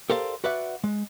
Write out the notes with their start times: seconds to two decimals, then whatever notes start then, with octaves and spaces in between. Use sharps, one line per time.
0.10 G4 A4 A#4 C5 D5 F5
0.44 F#4 B4 D5 E5 F#5
0.84 G#3